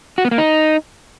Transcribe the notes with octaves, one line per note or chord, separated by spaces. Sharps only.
F#4
B3
A#3
D#4